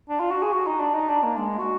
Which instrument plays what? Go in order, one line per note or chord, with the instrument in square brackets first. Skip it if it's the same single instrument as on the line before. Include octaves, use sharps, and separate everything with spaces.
[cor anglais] D4
F4
F#4
G#4
F#4
D#4
D4
D#4
D4
A#3
G#3
F#4